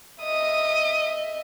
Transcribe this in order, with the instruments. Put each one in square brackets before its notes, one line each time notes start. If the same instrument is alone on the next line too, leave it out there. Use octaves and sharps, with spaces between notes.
[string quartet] D#5 E5 [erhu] D#6